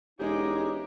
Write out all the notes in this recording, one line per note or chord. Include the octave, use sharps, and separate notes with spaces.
E1 G#3 C#4 D#4 G4 D6